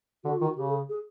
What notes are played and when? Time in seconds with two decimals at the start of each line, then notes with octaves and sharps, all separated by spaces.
0.24 D3 F#4
0.35 F4
0.41 D#3
0.44 F#4
0.56 C#3 G4
0.67 A4
0.72 G#4
0.89 G#4